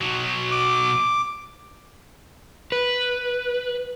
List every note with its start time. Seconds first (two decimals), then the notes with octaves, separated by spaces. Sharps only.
0.01 B2 F#3
0.51 D6
2.72 B4